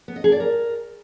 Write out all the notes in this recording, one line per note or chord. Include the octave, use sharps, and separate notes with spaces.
B3
D#5
G#4
D5
A#4